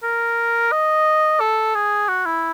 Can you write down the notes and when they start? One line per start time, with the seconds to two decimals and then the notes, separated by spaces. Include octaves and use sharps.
0.03 A#4
0.72 D#5
1.40 A4
1.75 G#4
2.08 F#4
2.26 E4